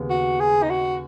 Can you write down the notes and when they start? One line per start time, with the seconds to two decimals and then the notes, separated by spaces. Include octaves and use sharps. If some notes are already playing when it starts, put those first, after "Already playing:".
Already playing: D#2 C#3 B3
0.10 F#4
0.40 G#4
0.63 D#4
0.70 F#4